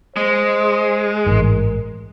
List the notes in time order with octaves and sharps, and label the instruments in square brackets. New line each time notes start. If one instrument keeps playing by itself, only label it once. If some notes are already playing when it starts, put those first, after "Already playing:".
[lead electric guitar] G#3 [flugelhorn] C5
[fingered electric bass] A1 G#2 [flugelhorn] A#4